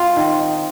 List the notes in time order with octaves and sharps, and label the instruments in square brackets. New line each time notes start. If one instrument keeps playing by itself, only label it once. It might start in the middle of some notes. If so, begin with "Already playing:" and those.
Already playing: [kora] C4 F4
D#3
D#4